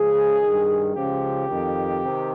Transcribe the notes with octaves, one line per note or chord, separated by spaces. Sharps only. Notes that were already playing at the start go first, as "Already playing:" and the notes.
Already playing: C#2 C#3 F3 G#4
G2 D#3
C#2 C#3 F3 G4
F2 D#3
C3 D#3